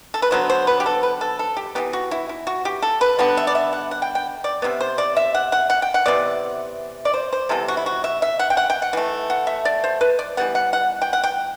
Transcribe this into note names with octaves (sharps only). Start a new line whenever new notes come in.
A4
B4
D3 F#3 B3 C5
C5
B4
G4
A4
B4
A4
A4
G4
E3 B3 G4
F#4
E4
E4
F#4
G4
A4
B4
D3 G3 B3 F#5
E5
D5
E5
F#5
F#5
G5
G5
D5
C3 G3 B3 E5
C5
D5
E5
F#5
F#5
F#5
G5
F#5
C3 E3 B3 D5
D5
C5
C5
C3 E3 G3 B3 A4
F#4
E4
F#4
E5
E5
F#5
G5
F#5
G5
F#5
E3 A3
F#5
E5
D5
C5
B4
D5
E3 G3 B3 F#5
F#5
F#5
G5
F#5
G5